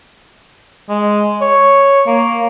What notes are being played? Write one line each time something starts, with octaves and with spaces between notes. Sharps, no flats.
G#3
C#5
A#3